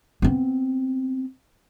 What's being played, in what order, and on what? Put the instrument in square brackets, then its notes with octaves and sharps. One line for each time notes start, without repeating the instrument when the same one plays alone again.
[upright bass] B3 C4